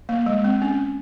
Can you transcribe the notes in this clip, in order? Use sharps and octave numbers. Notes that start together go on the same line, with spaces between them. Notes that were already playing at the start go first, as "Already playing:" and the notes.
A#3
G#3
C4
C#4